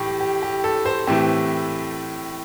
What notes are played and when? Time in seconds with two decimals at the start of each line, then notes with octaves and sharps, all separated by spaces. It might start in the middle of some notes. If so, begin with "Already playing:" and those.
Already playing: A2 E3 G4
0.20 G4
0.43 G4
0.64 A4
0.86 C5
1.07 A2 E3 A3 C4 G4